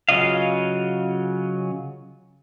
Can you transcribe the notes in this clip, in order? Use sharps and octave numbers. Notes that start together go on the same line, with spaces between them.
C#3 F#3 F4 D#5 F5